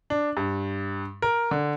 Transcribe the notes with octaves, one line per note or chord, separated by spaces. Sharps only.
D4
G2
A#4
D3